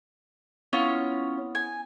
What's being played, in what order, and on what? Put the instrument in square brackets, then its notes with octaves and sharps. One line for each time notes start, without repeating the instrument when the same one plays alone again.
[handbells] B3 E4 D#6 [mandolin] C#4 F4 C#5
[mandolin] G#5